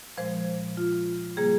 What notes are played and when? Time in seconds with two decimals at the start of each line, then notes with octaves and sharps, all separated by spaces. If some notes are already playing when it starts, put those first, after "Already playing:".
0.17 A#2 F3 G#3 C5
0.77 F4
1.37 C#3 G3 A#3 G#4